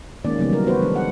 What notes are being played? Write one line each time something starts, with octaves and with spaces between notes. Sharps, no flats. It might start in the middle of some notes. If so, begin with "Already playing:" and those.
D#3 G#3 A#3 C#4 D5
C#3 E3 F#3 G3 A#3 B3
F#3 G3 A#4
B3 F#4 B4 C5
E3 G#3 D4
F#5